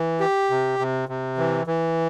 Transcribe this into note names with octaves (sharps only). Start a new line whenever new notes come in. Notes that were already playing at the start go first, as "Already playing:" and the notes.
Already playing: E3
G4
C3
C3
C3
E3
E3